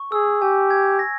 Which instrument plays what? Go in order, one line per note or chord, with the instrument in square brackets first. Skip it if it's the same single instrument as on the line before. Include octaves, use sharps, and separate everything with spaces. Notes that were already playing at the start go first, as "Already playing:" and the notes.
Already playing: [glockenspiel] C#6
[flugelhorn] G#4 [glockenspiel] E6
[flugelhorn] G4 [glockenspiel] G#5
[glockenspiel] G#6
A#6